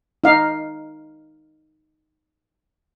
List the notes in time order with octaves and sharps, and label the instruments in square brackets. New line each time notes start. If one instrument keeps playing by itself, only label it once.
[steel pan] D#4 F5